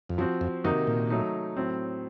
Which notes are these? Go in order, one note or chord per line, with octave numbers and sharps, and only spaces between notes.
F2
F#2 F3 C4 F#4
F2
F#2 C3 D#3 A#3 D#4 F#4
A#2
F#3 A3 D#4
A2 F#3 C4